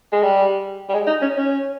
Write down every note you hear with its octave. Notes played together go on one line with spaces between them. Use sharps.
G#3
G3
G3
G#3
D#4
C#4
C#4